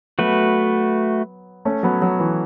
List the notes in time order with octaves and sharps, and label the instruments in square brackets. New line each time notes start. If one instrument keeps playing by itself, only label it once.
[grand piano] F#3 B3 [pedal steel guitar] A3 F#4 B4
[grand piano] A3 C#4
F#3 B3
F#3
E3